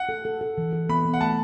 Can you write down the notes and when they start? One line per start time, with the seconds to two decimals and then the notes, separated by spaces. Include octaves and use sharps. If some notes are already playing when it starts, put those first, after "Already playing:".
Already playing: F#5
0.09 A4
0.25 A4
0.41 A4
0.58 E3
0.73 A4
0.89 B3 B5
1.05 B3
1.14 F#5
1.21 A3 A5